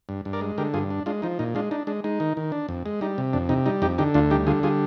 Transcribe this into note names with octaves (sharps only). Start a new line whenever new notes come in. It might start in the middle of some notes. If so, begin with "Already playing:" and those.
G2
G2
A#4 D5
G#3
D3 G4 A#4
G2 F4 G#4
D4
G#3 D4 F4
F3 D#4
A#2 D#4
G#3 D4 F4
D4 D#4
G#3 D4
G#3 D#4
D#3
D#3
D4
F2
G#3
G3 D#4
C3
F2 D4
C3 D#4
G3 D#4
F2 D#4 G4
D3 D#4 G4
D2 D4 F4
G3 D#4 G4
D3 F4 G#4
G3 F4 G#4